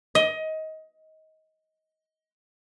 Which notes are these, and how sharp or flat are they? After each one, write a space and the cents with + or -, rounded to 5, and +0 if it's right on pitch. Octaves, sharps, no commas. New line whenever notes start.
D#5 +20